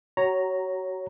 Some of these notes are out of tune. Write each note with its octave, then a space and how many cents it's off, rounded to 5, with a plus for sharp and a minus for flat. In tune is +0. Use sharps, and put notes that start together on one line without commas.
F#4 +30 C#5 +0 A#5 +0